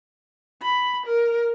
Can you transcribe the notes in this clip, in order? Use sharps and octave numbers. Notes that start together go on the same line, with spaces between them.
B5
A#4